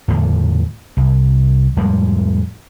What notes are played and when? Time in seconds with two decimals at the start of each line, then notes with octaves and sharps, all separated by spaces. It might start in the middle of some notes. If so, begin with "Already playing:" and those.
0.08 E2 A2 D3 F3
0.97 C2
1.77 F2 A2 G3 G#3